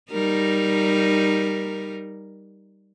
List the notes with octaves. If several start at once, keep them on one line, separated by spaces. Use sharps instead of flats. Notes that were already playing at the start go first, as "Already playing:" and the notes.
G3 D#4 A#4